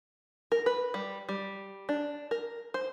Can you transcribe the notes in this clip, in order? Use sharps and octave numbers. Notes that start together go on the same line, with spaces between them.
A#4
B4
G3
G3
D4
A#4
C5